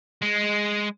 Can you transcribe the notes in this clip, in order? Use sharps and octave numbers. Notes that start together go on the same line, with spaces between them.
G#3